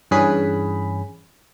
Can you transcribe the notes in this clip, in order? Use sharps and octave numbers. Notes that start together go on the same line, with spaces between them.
G2 E3 C#4 G#4 B5